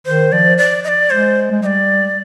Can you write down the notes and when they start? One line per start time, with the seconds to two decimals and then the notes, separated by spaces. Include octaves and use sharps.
0.06 D#3 C5
0.32 F3 D5
0.58 D5
0.84 D#5
0.89 D5
1.10 G#3 C5
1.51 G#3
1.62 G3 D#5
1.66 D5